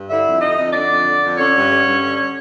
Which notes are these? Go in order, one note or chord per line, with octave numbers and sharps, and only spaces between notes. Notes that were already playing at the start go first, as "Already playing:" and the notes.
Already playing: G2
D3 E4 E5
F2
D3 D#4 D#5
F2
D3 D4 D5
F2
D3
F2
D3 C#4 C#5
G2
D3
G2
D3